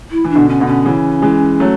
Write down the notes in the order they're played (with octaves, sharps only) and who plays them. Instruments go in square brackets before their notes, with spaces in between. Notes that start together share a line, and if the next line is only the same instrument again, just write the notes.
[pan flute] E4
[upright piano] E3
[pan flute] D4
[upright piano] B2 D3
[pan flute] C#4
[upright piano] B2 D3
[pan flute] C#4
[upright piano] C#3 E3
E3 G#3
F#3 A3